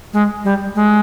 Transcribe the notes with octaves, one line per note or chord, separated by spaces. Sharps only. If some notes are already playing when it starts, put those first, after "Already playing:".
G#3
G3
G#3